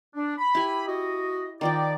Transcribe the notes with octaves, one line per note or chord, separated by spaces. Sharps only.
D4
B5
E4 G4 G#5
F#4 D#5
D#3 F3 D5 G5